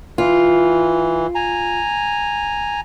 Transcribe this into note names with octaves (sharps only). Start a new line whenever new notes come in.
E3 F4
G#5 A#5